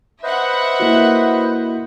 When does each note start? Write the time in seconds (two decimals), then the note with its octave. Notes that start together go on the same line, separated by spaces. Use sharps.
0.23 B4 C5 D#5 E5 F#5
0.80 A#3 E4 F#4